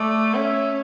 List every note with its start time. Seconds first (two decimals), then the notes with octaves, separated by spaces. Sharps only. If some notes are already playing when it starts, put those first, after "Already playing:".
Already playing: A3 D5
0.34 C#4 E5